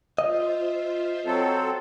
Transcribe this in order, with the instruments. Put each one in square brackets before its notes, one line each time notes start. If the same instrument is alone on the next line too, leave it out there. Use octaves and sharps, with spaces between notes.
[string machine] F4 C5 E5 [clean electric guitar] D#5
[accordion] F#3 C4 A4